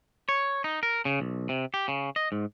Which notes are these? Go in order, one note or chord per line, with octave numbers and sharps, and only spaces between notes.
C#5
D#4
A#4
C#3
B1
C3
G4
C#3
D#5
G#2